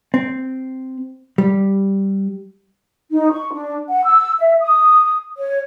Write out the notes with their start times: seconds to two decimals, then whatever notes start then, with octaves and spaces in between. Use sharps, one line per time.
0.14 C4
1.38 G3
3.11 D#4
3.32 C#6
3.53 D4
3.89 F#5
4.05 E6
4.39 E5
4.61 D#6
5.37 C#5